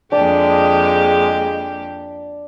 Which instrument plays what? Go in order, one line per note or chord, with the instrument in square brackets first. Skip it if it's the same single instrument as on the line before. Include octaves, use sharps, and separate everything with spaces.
[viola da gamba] F2 A#3 G4 [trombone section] G#3 [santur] D4